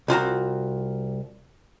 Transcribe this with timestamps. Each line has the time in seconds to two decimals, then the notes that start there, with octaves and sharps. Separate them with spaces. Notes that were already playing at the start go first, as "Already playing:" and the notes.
0.08 C2 F4 F#4 A#5